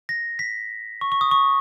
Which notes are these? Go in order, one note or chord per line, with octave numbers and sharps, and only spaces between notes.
A#6
B6
C#6
C#6
D#6
C#6